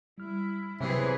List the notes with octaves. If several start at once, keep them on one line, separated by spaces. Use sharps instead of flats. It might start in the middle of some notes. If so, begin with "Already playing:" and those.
G3 E4 F6
C3 E3 F#3 B3 G#4 B4 C#5 E5